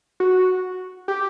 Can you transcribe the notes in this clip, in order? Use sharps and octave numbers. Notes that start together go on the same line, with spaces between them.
F#4
G4